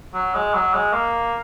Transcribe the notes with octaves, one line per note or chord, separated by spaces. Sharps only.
F#3
G#3
F#3
G#3
A#3